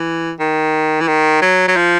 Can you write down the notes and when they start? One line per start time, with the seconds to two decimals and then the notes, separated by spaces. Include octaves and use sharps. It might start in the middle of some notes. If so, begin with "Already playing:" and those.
Already playing: E3
0.39 D#3
1.01 E3
1.07 D#3
1.42 F#3
1.68 F#3
1.76 F3